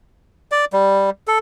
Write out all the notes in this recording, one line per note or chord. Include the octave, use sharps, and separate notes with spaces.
D5
G3
A4